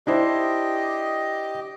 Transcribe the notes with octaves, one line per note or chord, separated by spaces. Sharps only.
D4 E4 G4 C5 D#5